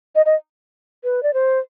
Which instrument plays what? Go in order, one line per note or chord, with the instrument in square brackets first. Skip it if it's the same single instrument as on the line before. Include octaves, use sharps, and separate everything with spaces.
[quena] D#5
D#5
B4
D5
C5